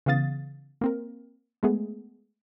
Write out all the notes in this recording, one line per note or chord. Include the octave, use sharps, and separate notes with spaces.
C#3 E3 B3 F5 D#6 A6
A#3 C4 A#4
G#3 A3 B3 G#4